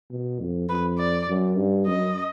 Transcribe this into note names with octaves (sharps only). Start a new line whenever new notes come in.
B2
F2
F2 B4
D5
F#2
G2
F#2 D#5